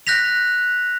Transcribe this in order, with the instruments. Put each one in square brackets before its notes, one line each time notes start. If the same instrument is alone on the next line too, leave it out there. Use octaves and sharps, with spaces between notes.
[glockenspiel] F#6 G6 A#6 B6 F7